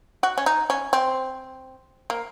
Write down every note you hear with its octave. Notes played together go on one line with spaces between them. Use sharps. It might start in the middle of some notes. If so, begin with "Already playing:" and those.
F#4
C#4
D#4
C#4
C4
A#3